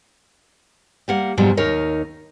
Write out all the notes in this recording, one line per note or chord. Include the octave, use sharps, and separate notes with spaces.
G3 A#3 F#5
F2 G#2 B2 F#3 G3
D#2 D#4 A#4 C#5